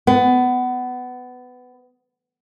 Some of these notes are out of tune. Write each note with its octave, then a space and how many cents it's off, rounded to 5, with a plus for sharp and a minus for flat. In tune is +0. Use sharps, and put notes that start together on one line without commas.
B3 +20